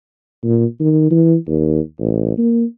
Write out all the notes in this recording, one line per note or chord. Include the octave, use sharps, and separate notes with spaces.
A#2
D#3
E3
D#2
A1
A#3